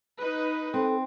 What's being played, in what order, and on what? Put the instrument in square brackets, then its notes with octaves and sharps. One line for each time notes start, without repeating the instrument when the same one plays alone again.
[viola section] D#4 B4
[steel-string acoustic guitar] C4 [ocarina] A4